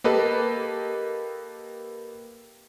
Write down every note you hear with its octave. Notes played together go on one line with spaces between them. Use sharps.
A#3 G4 A4 B4 D#5